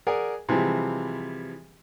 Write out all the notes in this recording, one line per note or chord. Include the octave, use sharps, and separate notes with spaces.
G#4 A#4 D5 F#5 G#5
C3 E3 F3 G3 G#3